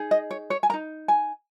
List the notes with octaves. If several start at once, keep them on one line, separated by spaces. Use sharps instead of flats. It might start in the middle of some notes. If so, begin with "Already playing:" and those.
Already playing: D#4 G#4
D#5
C#5
C#5
G#5
A#4 A#5
D#4
G#5